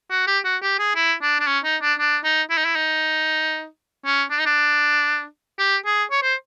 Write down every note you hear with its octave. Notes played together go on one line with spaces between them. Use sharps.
F#4
G4
F#4
G4
G#4
E4
D4
D4
C#4
D#4
D4
D4
D#4
E4
D#4
E4
D#4
C#4
D4
D#4
D4
G4
G#4
C#5
C5